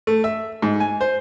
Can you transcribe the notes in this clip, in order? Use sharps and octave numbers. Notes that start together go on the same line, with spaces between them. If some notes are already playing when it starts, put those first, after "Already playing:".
A3
E5
G#2
G#5
C5